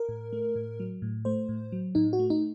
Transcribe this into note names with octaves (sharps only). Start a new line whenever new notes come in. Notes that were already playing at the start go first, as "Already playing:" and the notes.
Already playing: A#4
A2
A3
A2
F#3
A2
A3 C5
A2
F#3
A2 D#4
F#4
A3
D#4